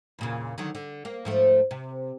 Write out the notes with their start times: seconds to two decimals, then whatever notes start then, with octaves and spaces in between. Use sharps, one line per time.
0.19 E2 A#2 C#3
0.58 D3 D#3 F#3
0.75 D3
1.05 A#3
1.25 G#2 F3 A3
1.71 C3